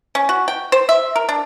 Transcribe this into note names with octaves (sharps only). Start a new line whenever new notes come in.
C#4
F#4
G5
C5
E5
A#4
D4